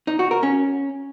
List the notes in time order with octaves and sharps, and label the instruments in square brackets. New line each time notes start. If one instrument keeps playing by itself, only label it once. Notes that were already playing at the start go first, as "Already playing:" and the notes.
[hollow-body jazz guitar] D#4
F#4
A#4
C#4